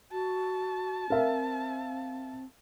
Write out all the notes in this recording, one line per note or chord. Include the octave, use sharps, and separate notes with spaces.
F#4 A5
C4 A#4 E5 F5